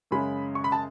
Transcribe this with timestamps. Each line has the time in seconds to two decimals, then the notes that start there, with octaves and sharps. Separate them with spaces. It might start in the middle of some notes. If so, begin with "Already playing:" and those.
0.11 F#2 C#3 G#3 C#4 B5
0.55 C#6
0.64 B5
0.72 A5